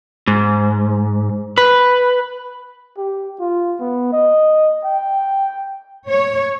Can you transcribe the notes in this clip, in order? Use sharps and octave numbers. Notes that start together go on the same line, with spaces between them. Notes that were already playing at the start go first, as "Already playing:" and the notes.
G#2
B4
G4
F4
B3
D#5
G5
C#5